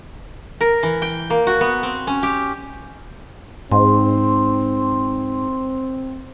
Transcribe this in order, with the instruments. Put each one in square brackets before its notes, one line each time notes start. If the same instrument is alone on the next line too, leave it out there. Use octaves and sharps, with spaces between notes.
[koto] A#4
E3
G5
A#3
F#4
B3
C4
C#4
G4
[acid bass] G#2 [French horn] C4 [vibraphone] C6